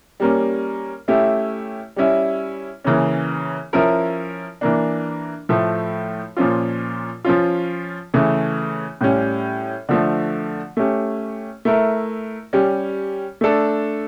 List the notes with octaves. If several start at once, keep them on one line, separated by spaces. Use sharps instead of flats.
G3 A#3 C#4
A3 C#4 E4 G4
G3 C#4 E4
C#3 E3 A#3 C#4
F3 C#4 E4 A#4
E3 A#3 D4
A2 F3 A3
A#2 F3 C#4 F4
F3 C#4 F4
C#3 E3 A3
A2 G3 C#4
D3 F3 A3
A3 C#4 G4
A3 E4 A#4
G3 C#4 G4
A3 D4 A4